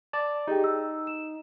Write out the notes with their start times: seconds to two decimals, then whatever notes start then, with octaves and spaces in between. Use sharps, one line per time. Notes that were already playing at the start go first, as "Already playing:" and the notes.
0.13 D5 A5
0.47 D#4 G4 G#4 G5
0.64 E6
1.07 E7